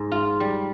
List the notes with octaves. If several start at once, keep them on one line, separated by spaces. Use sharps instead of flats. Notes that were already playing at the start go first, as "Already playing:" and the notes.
Already playing: G#2 G#4
F4
G3